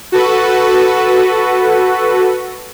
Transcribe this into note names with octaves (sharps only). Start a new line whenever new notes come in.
F#4 A4 B4